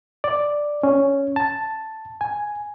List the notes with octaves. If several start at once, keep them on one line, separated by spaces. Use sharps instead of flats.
D5
C#4
A5
G#5